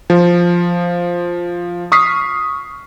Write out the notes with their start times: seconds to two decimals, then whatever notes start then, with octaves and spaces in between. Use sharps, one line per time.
0.10 F3
1.92 C#6 D#6 F6 B6 C7